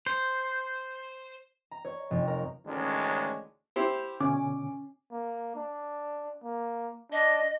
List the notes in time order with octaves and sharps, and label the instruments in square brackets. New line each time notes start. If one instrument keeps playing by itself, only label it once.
[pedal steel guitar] C5
[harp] A#5
C#5
F1
A#4
[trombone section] A1 D2 D#3 G#3 C#4 D4
[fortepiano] E4 G4 C5
[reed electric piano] B2 D3 [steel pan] C#4 [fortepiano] D6
[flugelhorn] A#3
D4
A#3
[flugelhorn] D4 [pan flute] D#5